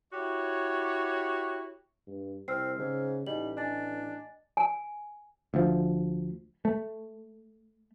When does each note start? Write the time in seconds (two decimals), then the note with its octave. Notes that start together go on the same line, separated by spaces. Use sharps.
0.13 E4 F#4 G4 C#5
2.07 G2
2.48 C2 C4 E6 F6 C7
2.79 G#2 C#3
3.27 A1 G3 D#4 D#5 F#7
3.57 D4 D#5 G#5 A6
4.57 G#5
5.54 D2 F3
6.65 A3